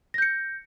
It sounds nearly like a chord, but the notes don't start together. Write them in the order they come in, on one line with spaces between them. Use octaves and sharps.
A#6 G6 C#7